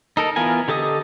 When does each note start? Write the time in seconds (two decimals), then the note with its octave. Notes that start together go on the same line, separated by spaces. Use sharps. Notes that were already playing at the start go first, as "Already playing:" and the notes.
0.17 D#4 A4 A#4
0.36 E3 B3 F4 A#4 G#5
0.68 D3 G4 A4 D#5 D#6